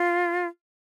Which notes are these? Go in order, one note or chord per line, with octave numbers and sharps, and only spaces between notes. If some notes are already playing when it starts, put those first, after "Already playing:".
Already playing: F4